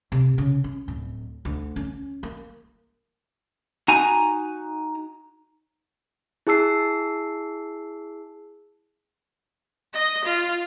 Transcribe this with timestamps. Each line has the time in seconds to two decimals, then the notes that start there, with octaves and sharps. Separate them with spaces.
0.12 C3
0.38 C#3
0.64 C#4
0.88 D1
1.45 D2
1.76 C#4
2.23 A#3
3.88 D#4 F#4 G#5 A#5
6.47 E4 G#4 A5 E6 C7
9.94 D#5
10.24 F4